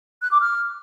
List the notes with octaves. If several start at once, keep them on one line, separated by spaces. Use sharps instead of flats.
F#6
D6
F6